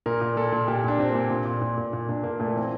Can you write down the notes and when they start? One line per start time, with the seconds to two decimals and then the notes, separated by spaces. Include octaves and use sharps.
0.06 A#2 A#4
0.21 A#2
0.37 A#2 A4
0.52 A#2
0.68 A#2 G4
0.84 A#2 D4
0.99 A#2 C4
1.09 A#3
1.15 A#2
1.30 A#2
1.45 A#2
1.62 A#2
1.78 A#2
1.93 A#2
2.09 A#2 D4
2.23 A#2 A#3
2.39 A#2 A3
2.55 E3 C4